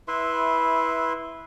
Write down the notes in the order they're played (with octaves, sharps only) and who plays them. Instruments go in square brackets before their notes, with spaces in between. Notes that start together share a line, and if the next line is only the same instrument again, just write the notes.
[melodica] E4 B4 E5 C6